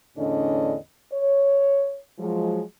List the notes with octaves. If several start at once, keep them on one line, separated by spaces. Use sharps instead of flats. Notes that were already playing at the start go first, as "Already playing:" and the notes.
E2 A2 D3 C#4 D4 D#5
C#5
F3 F#3 G#3